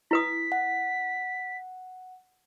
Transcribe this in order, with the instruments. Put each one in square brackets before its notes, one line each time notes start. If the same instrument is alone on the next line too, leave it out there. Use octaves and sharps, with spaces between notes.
[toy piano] E4 B4 D#6 [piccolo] B6
[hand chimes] F#5